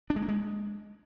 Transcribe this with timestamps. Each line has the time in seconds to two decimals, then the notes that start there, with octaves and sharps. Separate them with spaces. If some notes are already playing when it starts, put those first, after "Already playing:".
0.10 D4
0.16 G#3
0.22 A#3
0.28 G#3